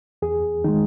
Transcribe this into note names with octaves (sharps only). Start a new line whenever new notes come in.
E2 G#4
D#3 G#3 D#4